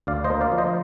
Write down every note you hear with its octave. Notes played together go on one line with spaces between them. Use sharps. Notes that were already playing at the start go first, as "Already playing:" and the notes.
D2 D5 F5
C5 D#5
A#3
D5 F5
F3
C5 D#5